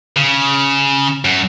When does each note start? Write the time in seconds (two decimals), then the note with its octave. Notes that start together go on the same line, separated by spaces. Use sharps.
0.17 C#3
1.25 F#2